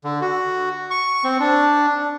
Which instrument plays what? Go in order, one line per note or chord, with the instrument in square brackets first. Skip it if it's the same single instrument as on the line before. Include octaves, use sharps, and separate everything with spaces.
[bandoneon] D3
F#4
C#6
C4
D4